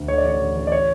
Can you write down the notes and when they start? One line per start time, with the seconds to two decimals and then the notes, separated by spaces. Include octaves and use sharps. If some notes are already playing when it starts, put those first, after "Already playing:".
Already playing: D2
0.08 D3 C#5
0.18 D5
0.24 A1 C#5
0.40 A1
0.55 A1
0.67 D5
0.72 C#5